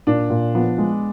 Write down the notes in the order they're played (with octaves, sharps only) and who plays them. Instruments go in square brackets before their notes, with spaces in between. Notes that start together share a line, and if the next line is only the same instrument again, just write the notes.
[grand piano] A#2 [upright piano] D4
[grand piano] A#2
[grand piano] F3 [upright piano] B3
[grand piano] G#3